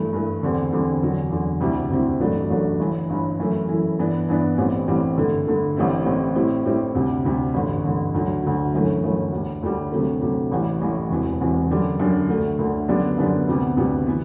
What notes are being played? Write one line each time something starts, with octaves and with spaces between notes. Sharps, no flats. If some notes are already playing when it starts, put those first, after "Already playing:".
Already playing: G2 E3 A3
G2 E3 A3
E2 D3 G3 C4
E2 D3 G3 C4
E2 D3 F#3
E2 D3 F#3
D2 C3 G3 C4 E4
D2 C3 G3 C4 E4
A1 G2 F#3 A3 D4
A1 G2 F#3 A3 D4
G1 G2 E3
G1 G2 E3
F#2 E3 A3 E4
F#2 E3 A3 E4
G2 E3 B3 D4
G2 E3 B3 D4
A1 A2 E3 G3 C4
A1 A2 E3 G3 C4
G2 D3 A3
G2 D3 A3
A1 A2 G3 C4 E4
A1 A2 G3 C4 E4
A2 G3 C4 E4
A2 G3 C4 E4
D2 C3 G3
D2 C3 G3
A1 G2 D3
A1 G2 D3
D2 D3 F#3
D2 D3 F#3
G1 F#2 E3 A3
G1 F#2 E3 A3
D2 D3 G3
D2 D3 G3
D2 C3 F#3 A3
D2 C3 F#3 A3
A1 A2 E3 G3
A1 A2 E3 G3
E1 E2 C3 E3
E1 E2 C3 E3
F#2 D3 G3 D4
F#2 D3 G3 D4
D2 D3 A3
D2 D3 A3
F#2 D3 G3 B3 D4
F#2 D3 G3 B3 D4
D2 C3 G3 B3
D2 C3 G3 B3
E3 B3